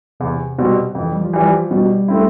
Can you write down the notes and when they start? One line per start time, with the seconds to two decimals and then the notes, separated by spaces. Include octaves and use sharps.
0.20 E2 C3
0.58 B2 G3 C4
0.95 F2 E3
1.12 G3
1.21 F3
1.33 E3 G3
1.45 F3
1.71 B2 G3
2.08 A3 C4 E4